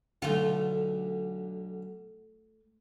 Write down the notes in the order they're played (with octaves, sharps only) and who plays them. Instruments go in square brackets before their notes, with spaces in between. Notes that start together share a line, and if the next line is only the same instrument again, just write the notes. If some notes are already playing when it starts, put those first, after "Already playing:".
[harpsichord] B1 D3 [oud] A3 F4